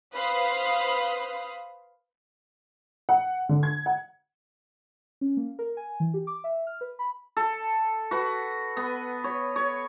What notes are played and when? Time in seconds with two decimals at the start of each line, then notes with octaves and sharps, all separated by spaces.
0.15 B4 C5 F5 B5 D#6 F#6
3.09 F#5
3.49 D3
3.63 G#6
3.86 F#5
5.21 C#4
5.37 A#3
5.59 A#4
5.77 G#5
6.00 E3
6.14 G4
6.27 D6
6.44 E5
6.67 F6
6.81 B4
6.99 B5
7.37 A4
8.11 F#4 B4
8.77 B3
9.24 C#5
9.56 C#5